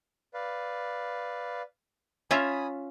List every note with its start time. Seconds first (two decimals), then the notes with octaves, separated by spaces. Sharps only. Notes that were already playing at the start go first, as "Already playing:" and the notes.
0.34 B4 D5 F5
2.31 C#4 F4 E5 G#5 B5 D#6